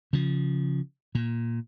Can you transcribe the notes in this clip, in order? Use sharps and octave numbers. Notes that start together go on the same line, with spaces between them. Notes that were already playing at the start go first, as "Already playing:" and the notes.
C#3 F3
A#2